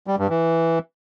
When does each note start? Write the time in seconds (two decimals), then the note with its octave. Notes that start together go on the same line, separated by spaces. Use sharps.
0.07 G3
0.18 G2
0.30 E3